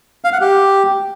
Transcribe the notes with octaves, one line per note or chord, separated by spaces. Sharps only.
F5
F#5
G4